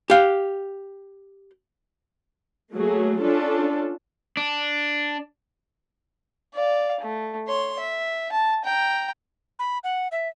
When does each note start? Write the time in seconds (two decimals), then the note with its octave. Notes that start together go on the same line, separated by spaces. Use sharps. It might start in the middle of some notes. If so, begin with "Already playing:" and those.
0.10 G4 F5
2.74 F#3 A3 A#3 G#4
3.20 C#4 D4 F4 A4
4.37 D4
6.54 D5 F5
7.01 A3
7.48 C#5 C6
7.79 E5
8.32 A5
8.64 G5 A#5
9.59 B5
9.84 F#5
10.12 E5